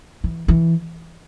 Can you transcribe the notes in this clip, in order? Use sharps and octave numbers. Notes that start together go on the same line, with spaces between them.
E3
E3